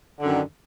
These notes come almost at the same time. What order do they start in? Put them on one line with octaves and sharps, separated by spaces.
D3 F#2 D#3